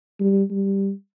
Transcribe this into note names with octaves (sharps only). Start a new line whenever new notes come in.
G3
G3